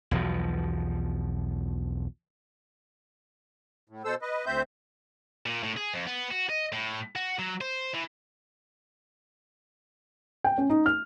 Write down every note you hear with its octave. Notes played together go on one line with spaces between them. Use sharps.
B1 E2 B2 F3
A2
B2 A4 C5 E6
B4 D#5
D2 C4 C5 E5 G6
A#2
A2
G#4
F2
B3
F#4
D#5
A2
F#4
F#3
C5
E3
G5
C#4
D#4
F6